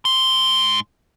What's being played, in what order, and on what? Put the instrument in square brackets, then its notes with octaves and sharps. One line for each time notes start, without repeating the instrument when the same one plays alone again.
[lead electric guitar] G#2 C6